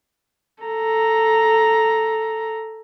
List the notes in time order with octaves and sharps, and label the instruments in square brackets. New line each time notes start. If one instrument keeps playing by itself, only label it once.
[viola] A4 A#5